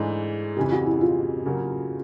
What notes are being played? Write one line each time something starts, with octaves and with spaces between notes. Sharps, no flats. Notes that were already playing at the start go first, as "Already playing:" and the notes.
Already playing: G#2 E3 A3 D4 G#4
F2 C#3 E3 G4
F#4
E4
F4
C#3 F#3 A#3